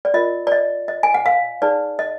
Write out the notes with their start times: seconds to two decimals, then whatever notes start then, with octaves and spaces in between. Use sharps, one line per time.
0.05 D5
0.14 F4 A#4 D#5
0.47 D5
0.52 D#5
0.88 D#5
1.03 G#5
1.14 F#5
1.26 F5
1.62 D#4 G#4 B4 D5
1.99 D#5